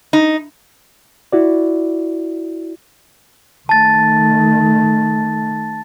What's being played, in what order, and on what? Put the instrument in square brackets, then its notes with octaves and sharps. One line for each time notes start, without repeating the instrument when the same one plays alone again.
[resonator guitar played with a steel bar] D#4
[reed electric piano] E4 F#4 D5
[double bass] D#3 A3 [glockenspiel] A5 A6